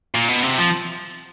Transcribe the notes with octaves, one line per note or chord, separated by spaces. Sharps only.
A#2
B2
C3
F3